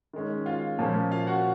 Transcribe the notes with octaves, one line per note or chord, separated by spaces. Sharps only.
D#3 G#3 C#4
F4 F5
A#2 F3 A#3 C#4
F4 F5
F#4 F#5